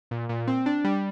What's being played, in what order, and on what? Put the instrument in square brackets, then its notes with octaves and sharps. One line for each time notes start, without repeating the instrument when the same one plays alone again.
[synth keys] A#2
A#2
C4
D4
G3